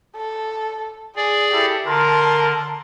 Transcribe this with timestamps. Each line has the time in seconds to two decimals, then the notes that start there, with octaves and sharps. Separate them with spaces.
0.16 A4
1.16 G#4 D5 G#5
1.53 E4 G4 A4
1.86 D3 A#4 A5 C6